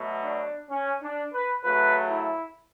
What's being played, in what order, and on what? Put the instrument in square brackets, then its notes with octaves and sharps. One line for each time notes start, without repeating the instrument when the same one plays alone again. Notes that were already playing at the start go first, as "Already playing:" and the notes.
Already playing: [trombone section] B2 F#3 A3
D4
C#4
D4
B4
C#3 F#3 A3 B4
E4